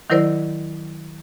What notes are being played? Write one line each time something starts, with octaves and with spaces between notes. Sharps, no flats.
D#3 F#3 E4 A#4 C5 D5